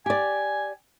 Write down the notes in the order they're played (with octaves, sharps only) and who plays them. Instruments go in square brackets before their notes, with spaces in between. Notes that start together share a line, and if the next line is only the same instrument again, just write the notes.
[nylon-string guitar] G4 D5 [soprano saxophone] G#5